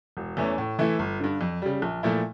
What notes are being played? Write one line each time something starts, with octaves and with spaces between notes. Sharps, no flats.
E1
E2 E3 A3 C#4
A2
E3 A3 E4
G1
G2 D3
F2
C#3 G3
A#1
A#2 F3 A3 E4